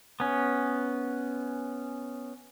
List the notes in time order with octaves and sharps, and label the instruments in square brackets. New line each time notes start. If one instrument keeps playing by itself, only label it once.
[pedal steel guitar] B3 C#4